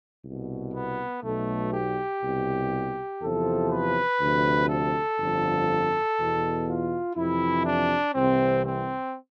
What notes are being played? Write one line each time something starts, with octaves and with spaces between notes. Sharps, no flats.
C2 B2
B3
B1 B2 A3
G4
C2 B2
E2 C3 F3 A4
B4
D2 C3 F3
A4
G1 F2 D3 F3
E2 B2
F4
F2 C3 E3 E4
D4
C2 C3 E3 C4
C4